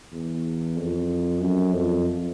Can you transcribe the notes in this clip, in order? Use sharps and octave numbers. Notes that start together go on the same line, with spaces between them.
E2
F2
F#2
F2